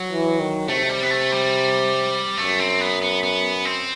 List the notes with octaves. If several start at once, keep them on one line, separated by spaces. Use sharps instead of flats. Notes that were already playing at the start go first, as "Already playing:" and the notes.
Already playing: F#3
E3
D#3
C3 A3
G3
B3
A3
G3
F#2 A3
C4
B3
B3
B3
C4